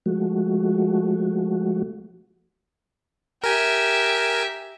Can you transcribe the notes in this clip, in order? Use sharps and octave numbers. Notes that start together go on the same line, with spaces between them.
F3 G#3 A3 F#4
G4 A#4 E5 G#5